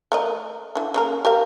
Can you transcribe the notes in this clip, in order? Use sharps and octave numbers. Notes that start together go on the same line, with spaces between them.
A3 A#4 D#5
D3 E3
C#3 A#3 A#4
G4 A#4 F5